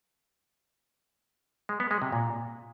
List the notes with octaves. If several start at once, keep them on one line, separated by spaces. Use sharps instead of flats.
G#3
B3
G#3
C3
A#2